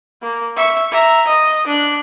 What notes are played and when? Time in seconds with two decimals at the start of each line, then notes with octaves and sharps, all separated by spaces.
0.22 A#3
0.57 E5 C#6
0.92 E5 A#5
1.27 D#5
1.68 D4 F#6